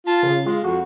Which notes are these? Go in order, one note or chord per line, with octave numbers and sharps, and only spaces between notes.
F4 A5
C#3
G#3 F4
F2 F#4